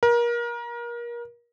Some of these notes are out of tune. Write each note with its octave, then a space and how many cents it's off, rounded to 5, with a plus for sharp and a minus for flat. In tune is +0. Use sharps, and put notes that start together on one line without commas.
A#4 +30